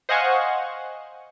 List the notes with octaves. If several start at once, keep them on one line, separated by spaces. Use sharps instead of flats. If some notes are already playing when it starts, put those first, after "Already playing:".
C5 D#5 F5 F#5 G#5 C#6